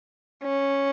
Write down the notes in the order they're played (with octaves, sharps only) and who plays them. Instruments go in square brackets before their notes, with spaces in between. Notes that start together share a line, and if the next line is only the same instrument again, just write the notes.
[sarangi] C#4